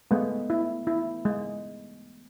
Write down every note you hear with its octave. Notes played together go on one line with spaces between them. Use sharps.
G#3 A3 B3
E4
E4
G#3